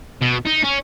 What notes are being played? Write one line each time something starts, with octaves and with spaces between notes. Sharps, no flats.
B2
D#4
C#4